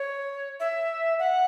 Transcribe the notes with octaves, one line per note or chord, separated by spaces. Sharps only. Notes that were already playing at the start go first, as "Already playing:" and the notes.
Already playing: C#5
E5
F#5